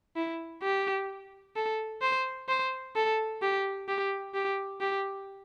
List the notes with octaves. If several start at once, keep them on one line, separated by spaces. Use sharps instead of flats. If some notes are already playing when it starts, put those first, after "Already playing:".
E4
G4
A4
C5
C5
A4
G4
G4
G4
G4